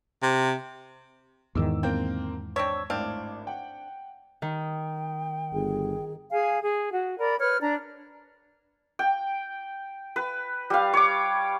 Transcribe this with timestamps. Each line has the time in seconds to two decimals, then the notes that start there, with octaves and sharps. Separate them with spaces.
0.23 C3
1.55 E2 G#2 D#3 D6 E6
1.83 D3 A#3 C4 G5
2.56 C4 D4 C#5 E6 G#6 B6
2.90 G#1 A2 C4 D4 F5
3.47 F#5 G5
4.42 D#3 G5
5.53 G1 G#4
6.32 G#4 F5 G#5
6.62 G#4
6.91 F#4
7.19 A#4 D5 B5
7.39 B4 C#5 F6
7.61 D4 D5 A#5
8.99 G5
10.16 B4
10.70 G3 F5
10.94 C#5 D6